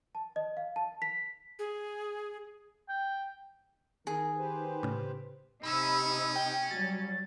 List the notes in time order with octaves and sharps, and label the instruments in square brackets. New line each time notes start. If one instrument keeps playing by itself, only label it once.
[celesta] A5
D#5
F5
A5
B6
[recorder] G#4
[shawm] G5
[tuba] D#3 [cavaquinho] G#4 [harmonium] A#4
[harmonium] G4 B4 C5
[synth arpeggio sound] A2 C#3
[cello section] C3 D#4 [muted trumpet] C#4 [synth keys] B5 E6
[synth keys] G5
[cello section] F#3 G3 [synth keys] A6